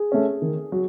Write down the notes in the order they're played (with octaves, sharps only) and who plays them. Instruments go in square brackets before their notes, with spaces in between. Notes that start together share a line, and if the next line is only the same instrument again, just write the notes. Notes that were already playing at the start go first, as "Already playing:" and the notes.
Already playing: [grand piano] G#4
A3 C#4
D#3
F#3